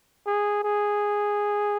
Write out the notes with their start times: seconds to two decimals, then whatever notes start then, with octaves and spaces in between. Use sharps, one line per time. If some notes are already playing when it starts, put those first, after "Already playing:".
0.27 G#4
0.64 G#4